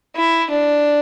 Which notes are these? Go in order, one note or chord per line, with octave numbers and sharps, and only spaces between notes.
E4
D4